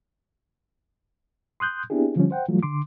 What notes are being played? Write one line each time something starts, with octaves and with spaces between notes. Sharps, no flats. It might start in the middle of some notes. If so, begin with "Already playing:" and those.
C6 D#6 F#6 G6
B3 C4 D4 E4 G4 G#4
D3 F3 G3 C#4
C5 F#5 G5
E3 F#3 G3 A3 F4
D3 C6 D6